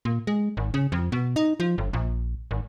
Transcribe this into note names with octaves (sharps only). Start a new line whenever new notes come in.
A#2
G#3
G#1
C#3
F2
B2
D#4
F3
G1
A#1
G#1